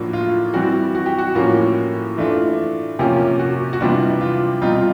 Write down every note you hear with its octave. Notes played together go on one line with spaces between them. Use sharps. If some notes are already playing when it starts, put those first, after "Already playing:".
Already playing: A2 F3 A#3 D4 F#4
F4
E3 G3 C4 F#4
F#4
G4
F#4
A2 F3 A#3 C#4 F#4
E3 A3 D4 F4
C3 F3 A#3 C#4 G4
F#4
F#4
C3 E3 G3 B3 D4 F4
F4
B2 G3 C4 D#4 F4
F4